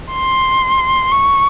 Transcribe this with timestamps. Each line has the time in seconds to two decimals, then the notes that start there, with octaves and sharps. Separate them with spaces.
0.13 C6
1.12 C#6